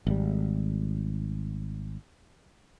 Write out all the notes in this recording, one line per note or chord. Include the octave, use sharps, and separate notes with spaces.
G#1 G3